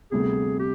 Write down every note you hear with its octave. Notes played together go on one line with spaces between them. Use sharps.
D2 C3 G3 B3 G#4
G4